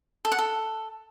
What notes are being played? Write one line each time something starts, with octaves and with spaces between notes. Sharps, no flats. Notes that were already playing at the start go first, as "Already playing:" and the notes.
A4
F#5
A4